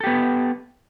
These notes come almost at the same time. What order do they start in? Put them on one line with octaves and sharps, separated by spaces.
A4 G4 B3